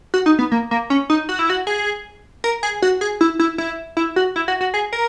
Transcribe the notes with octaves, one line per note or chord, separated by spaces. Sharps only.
F#4
D#4
B3
A#3
A#3
C#4
D#4
F#4
E4
F#4
G#4
A#4
G#4
F#4
G#4
E4
E4
E4
E4
F#4
E4
F#4
F#4
G#4
A#4